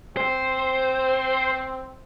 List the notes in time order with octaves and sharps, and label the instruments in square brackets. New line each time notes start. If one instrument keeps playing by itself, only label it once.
[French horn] C4 [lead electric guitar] C5